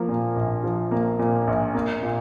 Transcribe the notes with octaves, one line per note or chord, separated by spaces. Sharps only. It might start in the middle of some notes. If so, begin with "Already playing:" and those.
Already playing: F3 A#3
A#2
A#1
F3
A#3
A#2
A#1
A#3
A#2